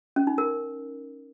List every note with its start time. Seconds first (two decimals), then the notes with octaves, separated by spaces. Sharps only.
0.16 C#4
0.27 D#4
0.38 A#4